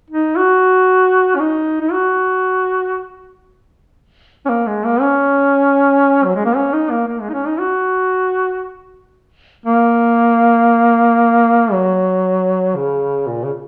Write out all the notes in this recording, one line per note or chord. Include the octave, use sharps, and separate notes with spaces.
D#4
F#4
C#4
D#4
D#4
F#4
C#4
A#3
G#3
A#3
C#4
F#3
G#3
A#3
C#4
D#4
A#3
A#3
G#3
D#4
C#4
D#4
F#4
A#3
F#3
C#3
A#2
C#3